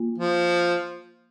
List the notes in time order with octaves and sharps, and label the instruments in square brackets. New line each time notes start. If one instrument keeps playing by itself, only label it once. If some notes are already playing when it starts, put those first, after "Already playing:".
Already playing: [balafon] A#3 F4
[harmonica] F3